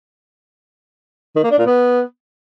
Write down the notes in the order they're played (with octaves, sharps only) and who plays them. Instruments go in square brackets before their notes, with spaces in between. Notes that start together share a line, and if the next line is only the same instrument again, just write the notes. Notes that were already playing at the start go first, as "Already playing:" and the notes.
[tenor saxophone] D#3
A#3
D4
A#2
B3